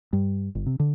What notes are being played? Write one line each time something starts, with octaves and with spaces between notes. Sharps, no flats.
G2
G1
C3
D3